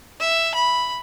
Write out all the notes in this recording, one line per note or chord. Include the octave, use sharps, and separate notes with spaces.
E5
B5